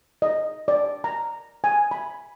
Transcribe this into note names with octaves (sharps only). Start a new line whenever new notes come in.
D#5
D5
A#5
G#5
B5